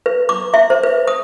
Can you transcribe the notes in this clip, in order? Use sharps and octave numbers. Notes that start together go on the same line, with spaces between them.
B4
D6
E5
C5
B4
D#6